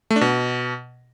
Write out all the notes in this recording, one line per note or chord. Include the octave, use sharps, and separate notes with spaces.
A3
D4
B2